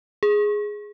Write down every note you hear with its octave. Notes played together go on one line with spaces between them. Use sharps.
G#4